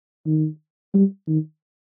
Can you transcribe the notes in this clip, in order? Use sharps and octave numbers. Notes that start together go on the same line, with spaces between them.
D#3
G3
D#3